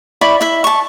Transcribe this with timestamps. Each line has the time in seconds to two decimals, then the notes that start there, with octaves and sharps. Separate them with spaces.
0.21 E4 D5 B5 C#6
0.41 E4 E5
0.64 A5 C#6